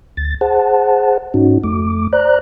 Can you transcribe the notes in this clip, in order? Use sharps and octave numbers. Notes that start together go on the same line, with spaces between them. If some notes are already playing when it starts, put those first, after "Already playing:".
D2 A6
G#4 C5 F#5 A5
G#2 C#4 D#4 F#4
F2 A3 D6
C5 D5 A#5 F#6